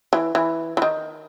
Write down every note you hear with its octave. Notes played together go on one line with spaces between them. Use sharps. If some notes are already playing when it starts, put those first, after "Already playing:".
E3
E3
E3
D#3